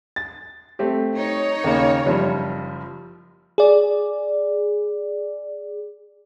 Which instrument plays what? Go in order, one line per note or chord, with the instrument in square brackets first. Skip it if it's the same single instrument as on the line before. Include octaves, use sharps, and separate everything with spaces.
[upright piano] A6
A3 C4 G4
[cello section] D#4 C#5
[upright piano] D#2 C#3 A#3
F#1 F3 G3
[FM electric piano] G#4 D5